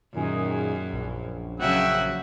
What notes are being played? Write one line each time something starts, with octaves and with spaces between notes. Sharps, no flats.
F#2 A#2 D#3 G#4
A#1
C#3 F#3 F#4 E5 F#5 G5